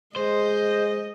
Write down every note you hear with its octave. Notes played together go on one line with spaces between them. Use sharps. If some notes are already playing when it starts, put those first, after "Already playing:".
G#3 C5 D#5